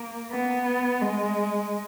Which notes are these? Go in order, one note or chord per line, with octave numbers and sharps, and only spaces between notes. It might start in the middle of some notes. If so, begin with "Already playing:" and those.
Already playing: A#3
B3
G#3